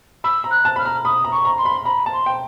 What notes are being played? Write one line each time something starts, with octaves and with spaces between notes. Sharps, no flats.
B5 E6
A#5
F#6
A5
B5 F6
A#5
B5 D#6
A#5
C#6
A#5
C6
B5
A#5 B5
A5
C6
G5